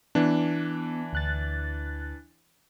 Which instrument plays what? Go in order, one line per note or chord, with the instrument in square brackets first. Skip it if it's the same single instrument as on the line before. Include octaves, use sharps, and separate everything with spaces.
[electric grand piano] E3 D4 [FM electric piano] B3
[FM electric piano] D2 F#6 A6